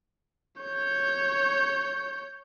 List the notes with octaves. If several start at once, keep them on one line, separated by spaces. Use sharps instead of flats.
C#5 G6